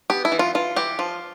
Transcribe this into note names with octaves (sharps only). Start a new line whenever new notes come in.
B3 G4
E4
E3
F4
E3 F4
E3 G4
F3 F4